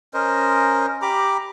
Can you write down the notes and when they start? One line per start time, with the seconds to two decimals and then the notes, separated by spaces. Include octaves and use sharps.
0.14 C#4 A#4 C5 D#5
1.02 G4 A#5 B5 D6